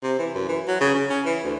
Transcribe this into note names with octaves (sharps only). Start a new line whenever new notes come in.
C3
E3
F#2
E3
F#3
C#3
C#3
C#4
E3
D2